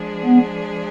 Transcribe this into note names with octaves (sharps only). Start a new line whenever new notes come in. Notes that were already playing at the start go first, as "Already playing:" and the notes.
Already playing: F3 G#3 D4 G#4
B3